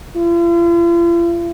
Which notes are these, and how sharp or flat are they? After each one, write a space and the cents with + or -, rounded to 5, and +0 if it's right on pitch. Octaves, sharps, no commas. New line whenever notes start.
F4 -45